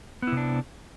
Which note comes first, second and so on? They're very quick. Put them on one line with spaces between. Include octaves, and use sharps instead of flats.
B3 E4 C3 D4